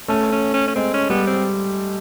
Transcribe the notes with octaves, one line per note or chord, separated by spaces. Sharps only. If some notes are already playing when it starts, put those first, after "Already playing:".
A3 C#4
C#4
C#4
C#4
G#3 C4
C#4
G3 B3
C4